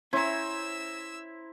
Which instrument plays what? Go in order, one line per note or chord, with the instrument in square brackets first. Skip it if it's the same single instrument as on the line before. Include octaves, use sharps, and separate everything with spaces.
[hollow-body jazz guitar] C#4 [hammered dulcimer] E4 [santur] C5 A#5 [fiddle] E5 E6